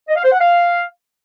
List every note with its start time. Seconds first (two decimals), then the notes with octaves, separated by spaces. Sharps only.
0.08 D#5
0.16 F5
0.24 C5
0.32 F#5
0.40 F5